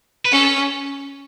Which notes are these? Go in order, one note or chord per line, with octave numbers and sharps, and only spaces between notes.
B4
C#4 A4